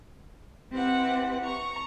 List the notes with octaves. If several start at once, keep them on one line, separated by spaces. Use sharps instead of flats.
C4 E4 G4 B4 F#5
A#5 C#6